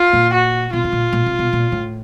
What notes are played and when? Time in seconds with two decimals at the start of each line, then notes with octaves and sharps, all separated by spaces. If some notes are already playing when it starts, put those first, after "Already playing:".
Already playing: F4
0.13 A#2
0.33 F#4
0.73 B2 F4
0.84 B2
0.92 A#2
1.12 A#2
1.26 C3
1.39 B2
1.53 A#2
1.72 A2